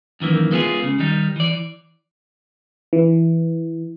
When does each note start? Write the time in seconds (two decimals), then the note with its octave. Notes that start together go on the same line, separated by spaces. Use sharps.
0.20 F#2 D#3 E3 A#3
0.51 G#3 B3 E4 F4 G#4
0.83 C#3
0.99 D#3 G3 D#4
1.36 E3 D5
2.93 E3